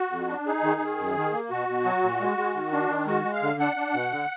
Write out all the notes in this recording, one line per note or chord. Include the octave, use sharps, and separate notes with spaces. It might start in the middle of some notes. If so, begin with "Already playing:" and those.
Already playing: F#4
F2
D4
D#4 G#4
D#3
D#3
F#2
D#3
A#3
B2 F#4
B2
F#3
A#2
G#3
G#3
D#3
D4
D#3
G#3 F#4
G#3
F5
D3
D4 F#5
D4
B2
D3